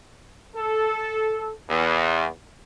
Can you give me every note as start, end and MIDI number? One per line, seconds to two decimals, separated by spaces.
0.56 1.52 69
1.70 2.27 40